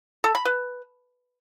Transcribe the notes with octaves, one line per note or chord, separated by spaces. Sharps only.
A4
B5
B4